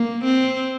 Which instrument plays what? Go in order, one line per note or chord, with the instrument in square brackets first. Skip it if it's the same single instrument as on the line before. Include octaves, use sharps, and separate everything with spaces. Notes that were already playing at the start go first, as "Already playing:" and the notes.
Already playing: [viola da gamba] A#3
C4